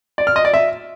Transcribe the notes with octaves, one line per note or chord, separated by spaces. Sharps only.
D5
F6
D#5
D5
E5